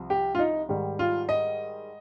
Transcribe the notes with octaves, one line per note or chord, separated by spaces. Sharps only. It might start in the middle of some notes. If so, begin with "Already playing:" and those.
Already playing: C2 F3
G4
F4
D#4
G#2 D#3 G3
F4
D#5